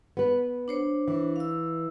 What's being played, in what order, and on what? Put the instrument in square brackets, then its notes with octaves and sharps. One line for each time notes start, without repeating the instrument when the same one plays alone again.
[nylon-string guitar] B3 B4
[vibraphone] D4 C5 C#5
[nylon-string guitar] E3
[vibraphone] F5 E6